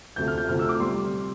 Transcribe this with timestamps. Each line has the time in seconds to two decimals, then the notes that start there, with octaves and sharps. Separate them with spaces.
0.16 D2 C3 F3 A3 G6
0.28 F6
0.38 G6
0.48 D2 C3 F3 A3 F6
0.59 E6
0.69 D6
0.80 C3 G3 C6